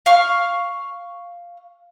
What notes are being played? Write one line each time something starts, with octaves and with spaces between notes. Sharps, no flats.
F5 C#6 F6